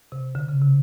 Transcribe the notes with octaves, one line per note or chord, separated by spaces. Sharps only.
C3
D3
C#3
C3